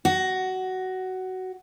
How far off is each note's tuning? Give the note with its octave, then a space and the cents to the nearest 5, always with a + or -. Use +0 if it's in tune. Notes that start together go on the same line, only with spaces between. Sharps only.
F#4 +15